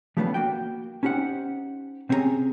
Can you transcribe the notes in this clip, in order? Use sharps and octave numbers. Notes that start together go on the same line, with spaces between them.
F3 G3 A3 B3 C#4 D4
A#3 F#4 G5
C#4 D#4 G4 C5 F#5
C3 C4 C#4 E4 G#4 A#5